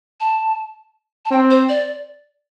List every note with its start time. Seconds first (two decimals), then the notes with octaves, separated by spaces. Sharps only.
0.20 A5
1.25 A5
1.31 C4 G5
1.50 C5
1.69 D5